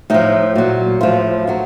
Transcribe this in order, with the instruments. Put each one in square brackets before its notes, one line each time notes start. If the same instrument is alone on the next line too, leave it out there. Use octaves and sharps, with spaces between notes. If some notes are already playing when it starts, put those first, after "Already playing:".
[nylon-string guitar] A2 F3 D#4
A#2 F#3
A2 F3 F4
D#3 F#3